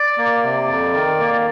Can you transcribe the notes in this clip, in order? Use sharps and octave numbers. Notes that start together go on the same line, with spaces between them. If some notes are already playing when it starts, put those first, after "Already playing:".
Already playing: D5
A#3
C3
F2
D#3
A#3